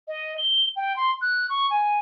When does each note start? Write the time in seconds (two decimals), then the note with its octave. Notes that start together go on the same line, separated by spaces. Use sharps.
0.08 D#5
0.38 G7
0.76 G5
0.96 C6
1.21 F#6
1.50 C#6
1.70 G#5